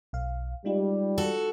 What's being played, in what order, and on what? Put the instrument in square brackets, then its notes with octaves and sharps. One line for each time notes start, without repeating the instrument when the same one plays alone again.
[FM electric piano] B1 F5
[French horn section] G3 [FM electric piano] G#3 D#4 F4
[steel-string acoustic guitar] F#4 A4